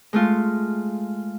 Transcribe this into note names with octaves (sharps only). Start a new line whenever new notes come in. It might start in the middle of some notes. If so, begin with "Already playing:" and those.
G#3 A3 F4